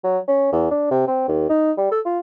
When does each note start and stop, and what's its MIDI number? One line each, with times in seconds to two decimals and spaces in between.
0.04 0.19 54
0.28 0.51 61
0.52 0.70 40
0.71 0.89 62
0.91 1.06 48
1.07 1.23 60
1.28 1.45 39
1.49 1.72 63
1.78 1.89 55
1.91 2.00 69
2.05 2.19 65